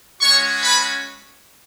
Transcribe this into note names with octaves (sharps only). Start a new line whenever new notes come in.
G#3 C#4 F#4 C#5 C#6
B4 B5